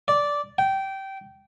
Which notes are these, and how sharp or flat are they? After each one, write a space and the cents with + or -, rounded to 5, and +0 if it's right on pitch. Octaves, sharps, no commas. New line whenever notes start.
D5 -10
G5 -15